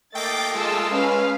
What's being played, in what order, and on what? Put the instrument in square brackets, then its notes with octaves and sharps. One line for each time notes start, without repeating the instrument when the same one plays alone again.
[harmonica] A3 A#3 D#5 [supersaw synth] G5 D6 [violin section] A6
[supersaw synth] G#3 [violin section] F4 A5 E6
[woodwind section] C#4 [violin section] B4 F5